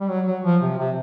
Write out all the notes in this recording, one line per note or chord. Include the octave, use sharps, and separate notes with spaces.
G3
F#3
F#3
F3
C3
C3